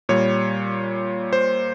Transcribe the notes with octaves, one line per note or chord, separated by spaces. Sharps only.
A#2 G3 C#5
C5